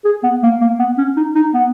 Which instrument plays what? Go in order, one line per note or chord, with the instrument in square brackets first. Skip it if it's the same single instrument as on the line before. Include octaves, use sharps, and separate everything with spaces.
[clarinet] G#4
B3
A#3
A#3
B3
C#4
D#4
D#4
B3